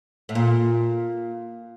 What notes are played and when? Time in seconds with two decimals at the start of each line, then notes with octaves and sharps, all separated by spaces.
0.29 A2
0.35 A#2